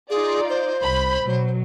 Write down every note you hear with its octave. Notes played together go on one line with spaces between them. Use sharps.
D#4 F4 G#4 D5
C5
C2 B5
B2 F#3